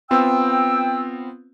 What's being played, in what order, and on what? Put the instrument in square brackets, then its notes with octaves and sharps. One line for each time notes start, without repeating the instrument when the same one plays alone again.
[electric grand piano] B3 C4 F4 [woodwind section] G5 E6